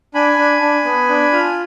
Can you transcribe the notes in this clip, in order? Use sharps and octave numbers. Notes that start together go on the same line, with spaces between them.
D4 G#5 B5
D4
D4
B3
D4
F4